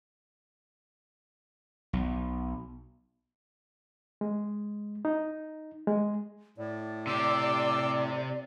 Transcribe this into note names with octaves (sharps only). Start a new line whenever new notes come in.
B1
G#3
D#4
G#3
A2 D5
C3 G4 C6 D6 E6